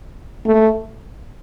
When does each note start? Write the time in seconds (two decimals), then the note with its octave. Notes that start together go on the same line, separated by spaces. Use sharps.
0.46 A3